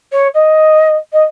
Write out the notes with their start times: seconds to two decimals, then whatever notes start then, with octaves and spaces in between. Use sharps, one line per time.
0.12 C#5
0.34 D#5
1.13 D#5